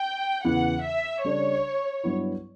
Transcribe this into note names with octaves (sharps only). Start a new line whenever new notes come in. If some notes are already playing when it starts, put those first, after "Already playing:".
Already playing: G5
E2 C#3 E3 B3 F#5
E5
C#3 G3 D4 A4 C#5 D5
G2 F#3 B3 E4